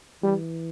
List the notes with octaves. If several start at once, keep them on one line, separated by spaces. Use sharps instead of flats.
E3 G3